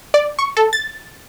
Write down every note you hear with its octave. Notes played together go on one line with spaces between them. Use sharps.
D5
C#6
A4
A6